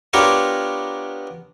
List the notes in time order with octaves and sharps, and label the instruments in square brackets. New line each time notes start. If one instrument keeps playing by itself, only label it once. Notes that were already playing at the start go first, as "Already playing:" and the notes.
[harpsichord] B3 D4 F4 G4 A#4 C#5